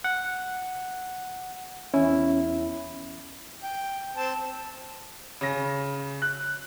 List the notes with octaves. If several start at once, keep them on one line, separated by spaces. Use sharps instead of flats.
F#5
E2 C#4 E4
G5
C4 A5
C#3 A#6
F#6